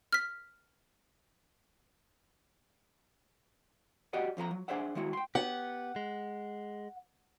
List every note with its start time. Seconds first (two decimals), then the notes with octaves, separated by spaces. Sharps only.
0.13 F6 B6
4.13 F#4 G4 D5 D#5 F#5
4.37 F2 F3 F#4 A#5
4.51 F#3
4.68 D4 G#4 C5 D5 E5 F#5
4.95 D#3 G#3 E4 F#4
5.13 G5 C6
5.35 B3 G4 F#5
5.96 G#3